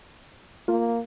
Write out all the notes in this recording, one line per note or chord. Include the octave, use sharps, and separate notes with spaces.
A#3 F4